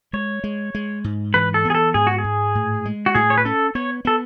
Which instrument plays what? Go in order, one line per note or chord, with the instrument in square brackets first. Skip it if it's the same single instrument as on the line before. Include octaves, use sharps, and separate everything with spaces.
[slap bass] G#3 [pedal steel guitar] C#5
[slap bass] G#3
G#3
G#2
[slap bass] E3 [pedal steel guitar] B4
[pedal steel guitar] A4
[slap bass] B3
[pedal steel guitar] G#4
A4
[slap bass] G#2 [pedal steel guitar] G#4
[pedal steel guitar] F#4
G#4
[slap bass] G#2
A2
G#3
[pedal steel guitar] F#4
[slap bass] A2 [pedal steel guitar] G#4
[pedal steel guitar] C#5
B4
[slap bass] C#4 [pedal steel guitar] A4
[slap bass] B3 [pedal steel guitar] C#5
[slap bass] B3 [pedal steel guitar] A4